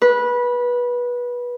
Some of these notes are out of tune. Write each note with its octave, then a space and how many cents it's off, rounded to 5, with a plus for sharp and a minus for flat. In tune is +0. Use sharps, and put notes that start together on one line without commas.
B4 -20